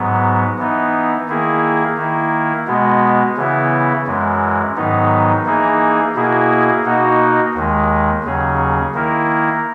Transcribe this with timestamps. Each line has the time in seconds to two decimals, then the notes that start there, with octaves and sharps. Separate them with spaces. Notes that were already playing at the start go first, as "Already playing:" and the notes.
Already playing: G#2 F#3 B3
0.58 E3 B3 D#4
1.28 D#3 A#3 E4 G#4
1.97 D#3 A#3 E4
2.67 B2 G#3 B3
3.37 C#3 E3 B3 E4
4.07 F#2 E3 G#3
4.76 G#2 D#3 F#3 B3 D#4
5.45 E3 A#3 D#4 G#4
6.16 B2 A#3 E4 G#4
6.84 B2 A#3 D#4 F#4
7.54 D#2 D#3 G#3
8.24 D#2 C#3 F#3 C#4 G#4
8.94 D#3 A#3 E4 A#4